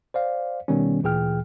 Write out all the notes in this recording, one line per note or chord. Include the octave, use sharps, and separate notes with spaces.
C5 D5 F5
B2 D#3 G3 B3 C#4
D2 A#2 E3 G#4 G5 F6